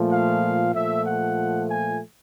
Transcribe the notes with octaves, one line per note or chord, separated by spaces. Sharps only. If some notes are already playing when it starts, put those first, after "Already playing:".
Already playing: A#2 F3 A3
F5
A#2 F3 A3 E5
F#5
G#5